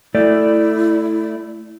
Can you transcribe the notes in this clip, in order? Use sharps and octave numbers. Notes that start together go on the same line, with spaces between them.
A3 E4 D5